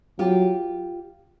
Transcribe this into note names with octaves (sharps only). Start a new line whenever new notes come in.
F#3 F4 G4